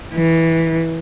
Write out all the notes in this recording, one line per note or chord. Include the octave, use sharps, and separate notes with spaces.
E3